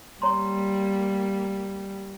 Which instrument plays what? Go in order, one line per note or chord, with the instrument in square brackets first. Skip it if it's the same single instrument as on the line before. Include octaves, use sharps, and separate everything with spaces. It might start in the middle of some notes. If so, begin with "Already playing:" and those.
[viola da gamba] G3 A#3 [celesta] C#5 A#5 C6